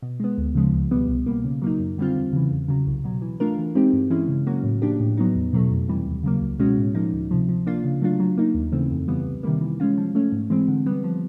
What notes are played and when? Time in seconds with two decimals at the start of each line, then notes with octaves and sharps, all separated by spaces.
0.02 B2
0.20 G#3 B3
0.38 D2
0.55 C#3 F3 G#3
0.73 C#2
0.91 B2 G3 B3
1.08 C2
1.26 B2 G3 A#3
1.44 C#3
1.62 F#3 A#3 D#4
1.79 F#2
1.98 D3 G3 C4 F4
2.15 E2
2.33 C#3 E3
2.51 E2
2.68 C#3 F#3
2.87 C2
3.04 B2 F#3
3.22 E3
3.40 A3 D4 F4 A#4
3.58 E3
3.75 G#3 C4 D#4 G4
3.93 G2
4.10 E3 G#3 C#4 E4
4.28 C#3
4.47 F#3 A#3 C#4 F#4
4.64 A2
4.82 F3 A#3 D4 G4
5.00 A2
5.17 F#3 B3 D#4
5.35 E2
5.53 B2 F#3 A3
5.70 F2
5.88 C3 E3 G3
6.06 D#2
6.23 C#3 F#3 A#3
6.41 C#2
6.59 B2 G#3 C#4 F#4
6.77 A2
6.95 F3 A#3 D#4
7.13 D2
7.31 C3 F3
7.49 F3
7.67 A#3 D4 F4
7.84 C#3
8.02 F#3 A3 D4 F4
8.20 F#3
8.37 A#3 D#4
8.54 D#2
8.72 C#3 E3 A3 C4
8.91 F2
9.08 C#3 E3 G3 B3
9.26 C2
9.43 C3 D#3 G3 A#3
9.61 E3
9.80 G#3 C#4 F4
9.98 F3
10.15 A3 C#4
10.32 G#2
10.50 E3 G#3 C4
10.68 D3
10.86 G3 B3
11.04 F3